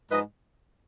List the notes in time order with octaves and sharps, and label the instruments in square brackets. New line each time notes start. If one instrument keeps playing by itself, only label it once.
[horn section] G#2 F3 B4 D#5